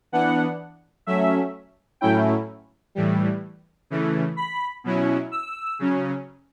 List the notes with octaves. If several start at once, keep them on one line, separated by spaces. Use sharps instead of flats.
E3 B3 D4 F#5
F#3 A3 C#4 E5
A2 F#3 A3 C#4 E4 G5
A2 E3 G3
C#3 E3 A3
B5
B2 F#3 C#4 E4
E6
C#3 F#3 C#4